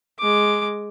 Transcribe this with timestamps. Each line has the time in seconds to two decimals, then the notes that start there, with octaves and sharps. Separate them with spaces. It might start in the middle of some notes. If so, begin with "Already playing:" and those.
0.19 G#3 D6